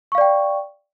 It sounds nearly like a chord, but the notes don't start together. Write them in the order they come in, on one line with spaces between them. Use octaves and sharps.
C#6 F5 D5 G5